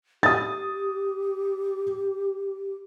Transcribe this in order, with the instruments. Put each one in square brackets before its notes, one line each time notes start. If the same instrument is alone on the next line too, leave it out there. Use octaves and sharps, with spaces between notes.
[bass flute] G4 [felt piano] D#6 A6